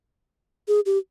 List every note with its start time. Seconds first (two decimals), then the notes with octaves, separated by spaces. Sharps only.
0.68 G#4
0.86 G4